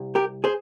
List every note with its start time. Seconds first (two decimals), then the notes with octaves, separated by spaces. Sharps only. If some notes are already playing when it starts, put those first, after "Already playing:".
Already playing: C2 C3
0.15 G4 A#4
0.44 G#4 C5